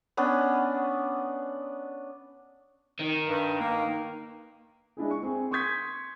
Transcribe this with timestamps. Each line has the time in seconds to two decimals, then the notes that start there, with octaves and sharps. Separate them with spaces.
0.17 B3 C#4 D4
2.99 D#3
3.27 G2
3.60 A#3
4.97 G#3 D4 E4 G#4
5.11 C#6
5.23 C4 G#4
5.51 C6 C#6 D#6 G6 G#6 B6